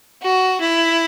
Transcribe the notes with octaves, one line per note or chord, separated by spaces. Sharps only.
F#4
E4